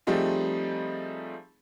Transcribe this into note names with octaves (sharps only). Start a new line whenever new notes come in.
F3 G3 A3 C4 D#4 G#4